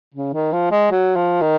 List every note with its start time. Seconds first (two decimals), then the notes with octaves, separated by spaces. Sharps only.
0.14 C#3
0.34 D#3
0.53 F3
0.72 G#3
0.91 F#3
1.16 F3
1.41 D#3